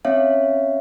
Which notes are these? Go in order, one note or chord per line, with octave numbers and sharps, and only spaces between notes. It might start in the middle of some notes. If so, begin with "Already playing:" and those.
C4 C#4 C#5 E5 F5